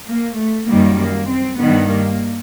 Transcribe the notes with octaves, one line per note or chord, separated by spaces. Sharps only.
A#3
A3
F#2 D#3 G3 A#3
A#3
C4
G2 D#3 G3 B3
A#3